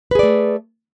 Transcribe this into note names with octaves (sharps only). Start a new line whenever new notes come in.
A3 G#4 B4 D5